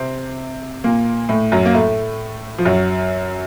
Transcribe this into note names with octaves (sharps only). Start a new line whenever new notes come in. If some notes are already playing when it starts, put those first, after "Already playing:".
Already playing: C3 C4
A#2 A#3
A2 A3
F#2 F#3
A#3
A2 A3
F3
F#2 F#3